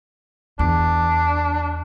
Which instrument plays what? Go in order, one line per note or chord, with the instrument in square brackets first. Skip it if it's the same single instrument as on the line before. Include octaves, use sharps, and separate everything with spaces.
[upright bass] E2 [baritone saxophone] D4